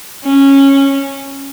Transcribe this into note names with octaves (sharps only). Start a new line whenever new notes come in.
C#4